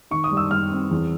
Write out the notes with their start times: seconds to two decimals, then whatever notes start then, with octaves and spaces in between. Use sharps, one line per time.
0.11 D#3 C#6
0.24 D#6
0.31 G3
0.37 E6
0.51 G3 F6
0.71 C4
0.91 E2